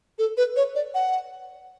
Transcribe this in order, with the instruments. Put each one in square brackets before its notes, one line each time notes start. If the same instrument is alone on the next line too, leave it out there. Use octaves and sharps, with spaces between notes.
[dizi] A4
B4
C#5
D5
F#5